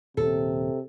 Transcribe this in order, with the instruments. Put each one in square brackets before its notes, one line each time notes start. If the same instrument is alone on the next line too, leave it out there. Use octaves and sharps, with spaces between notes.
[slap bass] D#1 [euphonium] C3 [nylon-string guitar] A4